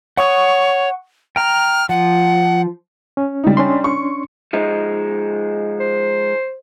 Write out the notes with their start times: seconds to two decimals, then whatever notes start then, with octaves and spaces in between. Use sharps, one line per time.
0.17 C#5 F#5 C#6 D#6
1.36 G5 A#5 F6
1.89 F3 F#5
3.17 C#4
3.44 G3 D#4
3.57 C#4 D4 C6
3.84 C#6
4.53 F3 G#3 D#4
5.80 C5